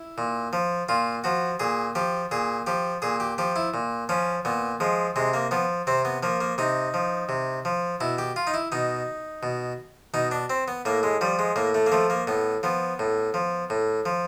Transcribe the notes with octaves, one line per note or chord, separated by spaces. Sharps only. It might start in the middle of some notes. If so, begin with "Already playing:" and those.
Already playing: E4
A#2
F3
A#2 F4
F3 F#4
A#2 G#4
F3 G4
A#2 G#4
F3 G4
A#2 G#4
G4
F3 G4
E4
A#2
F3 C#4
A#2 B3
F3 G#3
C3 G#3
A#3
F3 B3
C3 C4
B3
F3 A#3
A#3
C3 D#4
F3
C3
F3
B2 E4
G4
F4
D#4
E4
B2 D#4
B2
B2 D#4
D4
C4
B3
A2 A#3
G#3
F3 G3
G#3
A2 A#3
A3
A#3
F3 A3
A#3
A2 B3
F3 B3
A2
F3
A2
F3